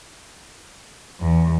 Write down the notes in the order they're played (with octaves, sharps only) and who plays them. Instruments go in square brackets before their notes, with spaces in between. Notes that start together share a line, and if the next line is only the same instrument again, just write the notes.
[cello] E2